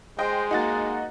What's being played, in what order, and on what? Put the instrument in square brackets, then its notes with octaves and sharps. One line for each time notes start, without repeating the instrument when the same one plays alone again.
[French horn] G#3 [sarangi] C5 [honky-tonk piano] D#5 G5
[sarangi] A#3 [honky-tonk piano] D#4 F#4 A6